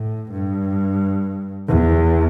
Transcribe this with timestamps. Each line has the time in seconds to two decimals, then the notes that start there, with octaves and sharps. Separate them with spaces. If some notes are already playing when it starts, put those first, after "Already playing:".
Already playing: A2
0.32 G2
1.69 E2